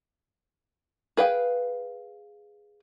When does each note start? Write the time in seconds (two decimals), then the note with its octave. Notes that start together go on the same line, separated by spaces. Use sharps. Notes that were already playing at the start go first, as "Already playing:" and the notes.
1.17 G#4 B4 F5 G5